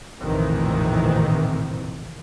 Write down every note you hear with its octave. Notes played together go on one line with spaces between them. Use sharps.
A#1 F2 A2 C3 D#3 E3